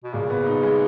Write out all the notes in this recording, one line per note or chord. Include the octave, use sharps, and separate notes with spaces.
B2
A#2 C#3
B3
D#4
G#3